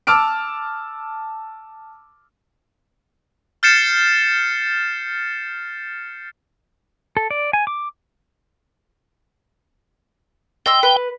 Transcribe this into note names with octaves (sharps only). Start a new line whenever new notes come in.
A5 D6 E6 F6 D7
F6 G6 A6 C7 C#7 E7
A4
D5
G#5
D6
D#5 G5 C6 E6
B4